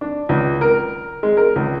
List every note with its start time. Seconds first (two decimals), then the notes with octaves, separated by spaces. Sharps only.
0.01 D4
0.29 C#2
0.61 A#4
1.23 G#3
1.37 A#4
1.56 C#2